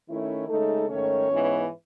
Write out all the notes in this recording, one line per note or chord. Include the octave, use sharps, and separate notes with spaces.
D#3 A3 C#4 E4
C#3 G#3 A3 D#4 A4
G#2 D#3 A3 C#4 C#5
G#2 E3 B3 D#4